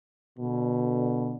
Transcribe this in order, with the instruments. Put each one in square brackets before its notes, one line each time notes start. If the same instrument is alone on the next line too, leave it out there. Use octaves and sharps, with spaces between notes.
[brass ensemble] B2 D3